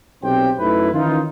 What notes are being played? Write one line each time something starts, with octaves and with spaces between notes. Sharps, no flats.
B1 C3 C4 G4 C5 G5
F#2 A3 D#4 E4 B4
D#3 E3 C#4 D#4 F4